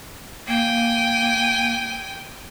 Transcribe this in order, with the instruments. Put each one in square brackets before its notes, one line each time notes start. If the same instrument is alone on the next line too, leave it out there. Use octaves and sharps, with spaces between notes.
[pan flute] A#3 [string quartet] G5 G#5